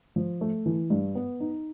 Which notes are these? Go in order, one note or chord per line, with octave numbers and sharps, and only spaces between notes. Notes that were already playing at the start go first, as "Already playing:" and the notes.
F3
A3
E3
G2
B3
D#4